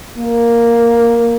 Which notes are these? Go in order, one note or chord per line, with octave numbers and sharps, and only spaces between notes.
A#3